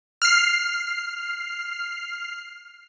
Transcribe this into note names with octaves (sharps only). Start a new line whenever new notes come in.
F6 C7